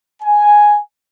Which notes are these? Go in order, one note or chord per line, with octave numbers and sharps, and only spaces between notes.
G#5